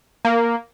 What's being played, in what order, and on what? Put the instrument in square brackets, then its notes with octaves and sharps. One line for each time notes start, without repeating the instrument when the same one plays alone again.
[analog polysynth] A#3